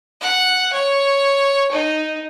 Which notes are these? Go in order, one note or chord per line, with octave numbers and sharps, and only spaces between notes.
F#5
C#5
D#4